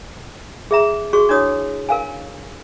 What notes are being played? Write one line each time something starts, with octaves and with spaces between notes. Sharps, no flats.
G#4 E5 A#5
F#4 G#4 C#6
D4 E4 F#4 C#5 D#6
A#4 F5 G#5